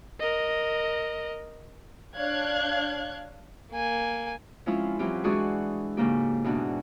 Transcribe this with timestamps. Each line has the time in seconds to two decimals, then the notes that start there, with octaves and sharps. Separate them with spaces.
0.20 A#4 D#5
2.17 D4 C#5 F5 F#6 G#6
3.72 A#3 G#5
4.66 F3 G#3 C4 C#4 E4 F4
4.99 E3 F#3 C4 C#4 F4 G4
5.24 E3 G#3 D4 F#4 G#4 C#6
5.97 G#2 C#3 A#3 G4
6.44 E2 B2 D4